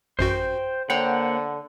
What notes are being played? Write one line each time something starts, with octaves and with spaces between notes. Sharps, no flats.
A1 F#2 F#4 C5 G5
D3 A#3 C5 C#5 F#5 G5